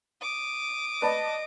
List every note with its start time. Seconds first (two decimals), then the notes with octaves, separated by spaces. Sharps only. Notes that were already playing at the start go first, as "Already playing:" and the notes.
0.21 D6 D#6
1.02 B4 D5 D#5 A5